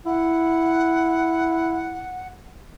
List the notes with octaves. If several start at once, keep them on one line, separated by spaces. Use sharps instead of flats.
E4 F#5